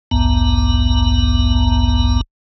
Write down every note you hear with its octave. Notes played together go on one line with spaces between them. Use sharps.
A1 D2 G2 B3 A#5